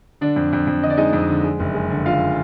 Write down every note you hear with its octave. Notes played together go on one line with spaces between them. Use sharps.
D3 D4 D5
F2
F2
F2
D3 D#5
D5
G#3 D#4 D#5
F2
D3
G#3
F#1
G#3
D3
D3 F4 F5